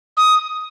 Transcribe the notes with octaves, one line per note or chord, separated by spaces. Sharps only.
D#6